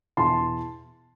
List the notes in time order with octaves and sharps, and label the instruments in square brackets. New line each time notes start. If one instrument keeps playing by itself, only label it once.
[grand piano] E2 B2 A5 C6